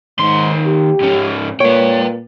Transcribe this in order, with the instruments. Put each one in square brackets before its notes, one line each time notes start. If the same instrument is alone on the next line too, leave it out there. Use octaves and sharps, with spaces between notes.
[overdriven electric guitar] D#2 C6 [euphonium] G#2
[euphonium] G4
[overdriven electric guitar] G#2 C#4
[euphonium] A#2 [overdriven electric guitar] B4 G5 [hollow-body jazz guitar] C#5